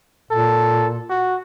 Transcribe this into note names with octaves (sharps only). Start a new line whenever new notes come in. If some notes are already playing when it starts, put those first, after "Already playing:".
A#2 A4
F#4